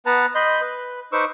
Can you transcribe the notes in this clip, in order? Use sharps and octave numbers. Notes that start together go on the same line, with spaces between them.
B3 B4 F#5 A5 A#5
D#5 B5 C6 G6
B4
D#4 B4 C5 C#6 D6 E6